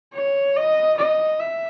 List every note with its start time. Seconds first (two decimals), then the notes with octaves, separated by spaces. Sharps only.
0.13 C#5
0.56 D#5
0.98 D#5
1.39 E5